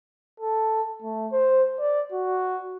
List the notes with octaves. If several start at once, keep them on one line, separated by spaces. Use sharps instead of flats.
A4
A3
C5
D5
F#4